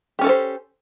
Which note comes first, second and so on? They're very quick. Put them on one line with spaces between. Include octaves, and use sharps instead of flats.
G4 C#4 A4 A#4 C5